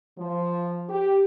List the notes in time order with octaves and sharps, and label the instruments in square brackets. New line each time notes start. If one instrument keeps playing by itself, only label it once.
[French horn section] F3
G4